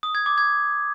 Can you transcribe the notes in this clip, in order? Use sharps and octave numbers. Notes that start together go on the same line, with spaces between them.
D#6
G#6
D6
G#6